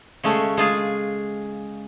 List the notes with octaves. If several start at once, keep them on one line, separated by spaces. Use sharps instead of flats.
C#3 G#3 A3 C#4
G#3 F4 G#4